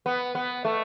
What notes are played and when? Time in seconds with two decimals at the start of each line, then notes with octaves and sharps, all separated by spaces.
0.06 B3
0.35 B3
0.65 A3